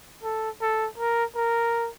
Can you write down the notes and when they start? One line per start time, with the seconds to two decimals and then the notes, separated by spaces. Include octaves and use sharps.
0.23 A4
0.61 A4
0.98 A#4
1.36 A#4